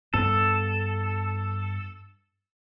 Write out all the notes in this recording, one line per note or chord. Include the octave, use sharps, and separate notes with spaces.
G2 B3 A4